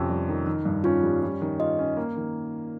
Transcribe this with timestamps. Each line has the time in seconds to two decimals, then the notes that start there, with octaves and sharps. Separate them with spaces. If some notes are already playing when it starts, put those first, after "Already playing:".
Already playing: F2 C3 C#4
0.10 G3
0.28 D#3
0.46 D#3
0.65 G2
0.84 C#4 F4
1.03 G3
1.23 G3
1.41 D#3
1.59 F4 D#5
1.79 C#4
1.97 A#3
2.17 D#3